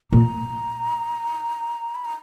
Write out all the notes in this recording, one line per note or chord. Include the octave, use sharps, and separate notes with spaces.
A#2 A#5
B5
A#5